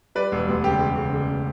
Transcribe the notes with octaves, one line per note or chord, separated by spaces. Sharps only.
G3 B4 D5
E1
D2
C#3 G4
C#3
C#3
C#3